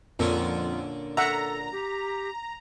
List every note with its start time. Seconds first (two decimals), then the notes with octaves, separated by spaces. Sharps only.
0.19 F2 A#2 D3 C#4 F4
1.17 A4 E5 F#5 A#5
1.72 G4